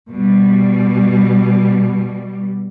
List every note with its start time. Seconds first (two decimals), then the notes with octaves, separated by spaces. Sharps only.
0.10 B2 G3